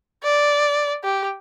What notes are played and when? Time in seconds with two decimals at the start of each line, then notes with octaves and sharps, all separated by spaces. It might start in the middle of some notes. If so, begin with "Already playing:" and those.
0.24 D5
1.04 G4